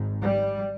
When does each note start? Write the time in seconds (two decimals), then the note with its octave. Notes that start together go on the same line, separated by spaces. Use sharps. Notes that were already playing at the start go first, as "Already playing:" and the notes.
Already playing: G#1 G#2
0.22 G3